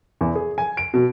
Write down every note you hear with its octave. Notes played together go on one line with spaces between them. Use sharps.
E2
G#4
G#5
D7
B2